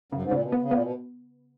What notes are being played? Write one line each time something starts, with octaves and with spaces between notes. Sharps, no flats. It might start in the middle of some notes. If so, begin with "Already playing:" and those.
F#2 C#3
G#2
A#2 C#3
B2
B3
C#3
A#2 B3
B2